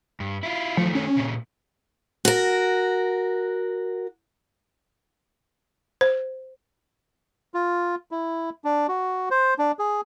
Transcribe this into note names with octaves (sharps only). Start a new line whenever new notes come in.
G2
E4 F4
D#3 F3 A3
C#4
A#2 C#3
F#4 A#4
C5
F4
E4
D4
F#4
C5
D4
G#4